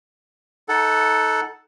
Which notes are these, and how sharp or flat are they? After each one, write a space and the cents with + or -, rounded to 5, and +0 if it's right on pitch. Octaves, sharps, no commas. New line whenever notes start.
D#4 +20 A4 +0 F#5 +0